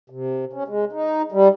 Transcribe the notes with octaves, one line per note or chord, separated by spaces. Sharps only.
C3
C#4
G#3
D#4
G3